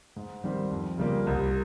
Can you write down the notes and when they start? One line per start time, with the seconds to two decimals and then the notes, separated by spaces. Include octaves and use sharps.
0.16 G#2
0.44 D#3 G3 C4
0.71 F2
0.98 C#3 G3 A#3 F4
1.27 C2